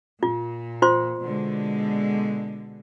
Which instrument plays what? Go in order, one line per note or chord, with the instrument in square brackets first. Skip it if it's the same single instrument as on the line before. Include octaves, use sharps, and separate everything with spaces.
[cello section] A#2 [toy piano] F4
[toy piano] F4 C5 C6
[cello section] B2 D3 G#3